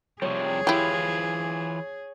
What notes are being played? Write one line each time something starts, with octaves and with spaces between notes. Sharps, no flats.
C3 F3 G3 G#4 C#5
E3 E4 F4 G4